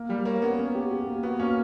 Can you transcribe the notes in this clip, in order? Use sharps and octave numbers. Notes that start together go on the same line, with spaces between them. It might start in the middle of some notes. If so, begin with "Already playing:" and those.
Already playing: A#3
G3 G4
A#3 C#5
B3 C#4
C#4
G4
G4
A#3
B3 F#4
A#3 C#4